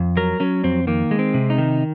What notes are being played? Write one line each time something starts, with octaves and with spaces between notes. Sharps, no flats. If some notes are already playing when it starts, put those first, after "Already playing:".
Already playing: F2
F#3 A#4
F#3 C#4
F2 C4
D#3 A#3
G#3
C4
C3
D#4
D#3